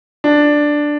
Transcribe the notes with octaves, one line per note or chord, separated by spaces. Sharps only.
D4